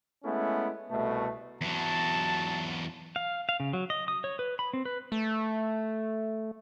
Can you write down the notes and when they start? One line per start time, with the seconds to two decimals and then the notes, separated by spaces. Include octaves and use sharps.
0.24 G#3 A3 B3 C#4 E4
0.91 C2 B2 A3
1.61 E2 F#3 A5
3.16 F5
3.49 F5
3.60 C#3
3.73 F#3
3.90 D#5
4.08 D#6
4.24 C#5
4.39 B4
4.59 B5
4.73 C4
4.85 B4
5.12 A3